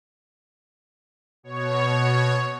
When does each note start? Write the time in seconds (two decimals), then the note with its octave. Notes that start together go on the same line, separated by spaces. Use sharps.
1.43 B2 C#5